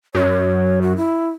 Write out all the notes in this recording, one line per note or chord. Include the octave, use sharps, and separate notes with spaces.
F#2 C#5
F#4
E4